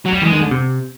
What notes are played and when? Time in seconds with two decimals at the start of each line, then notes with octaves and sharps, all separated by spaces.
0.06 F#3
0.12 F3 G3
0.22 E3 G#3
0.32 D#3
0.41 D3
0.51 C3